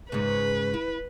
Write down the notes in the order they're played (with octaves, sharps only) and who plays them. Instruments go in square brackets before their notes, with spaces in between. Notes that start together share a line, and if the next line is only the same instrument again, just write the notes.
[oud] G#2 C#3 [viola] B4
[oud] E4